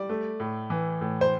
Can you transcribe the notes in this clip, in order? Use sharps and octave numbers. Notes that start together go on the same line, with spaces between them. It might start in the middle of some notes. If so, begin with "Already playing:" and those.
Already playing: G3 D5
A3
A2
E3
A2
C5